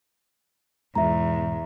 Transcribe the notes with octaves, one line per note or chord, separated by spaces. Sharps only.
E2 G#2 B2 G#3 E5 A#5